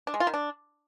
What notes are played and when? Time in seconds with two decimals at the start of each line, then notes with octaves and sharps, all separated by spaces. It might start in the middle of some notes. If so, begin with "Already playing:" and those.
0.07 D4
0.14 G#3
0.20 F4
0.27 D#3
0.34 D4